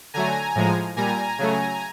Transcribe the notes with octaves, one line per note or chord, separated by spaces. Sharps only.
D3 F#3 A3 G#5 A#5
A2 F3 G#3
A#2 G3 G#5 A#5
C#3 F#3 A3